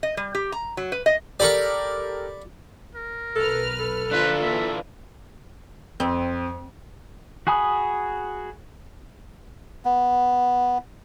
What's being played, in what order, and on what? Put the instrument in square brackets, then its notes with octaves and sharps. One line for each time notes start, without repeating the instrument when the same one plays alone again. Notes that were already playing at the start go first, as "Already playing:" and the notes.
[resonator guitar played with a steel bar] D#5
G3
G4
A#5
F#3
B4
D#5
[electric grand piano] G4 A4 A#4 [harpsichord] D5 B5 C#6
[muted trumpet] A#4
[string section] B1 B4 F6 [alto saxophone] A4
[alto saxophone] A4
[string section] D3 F3 [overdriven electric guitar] D4 F4 [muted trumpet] B4
[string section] E3 [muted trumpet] E5
[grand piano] F2 [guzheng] C4
[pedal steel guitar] F#4 G#4 G#5 B5 D#6
[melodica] B3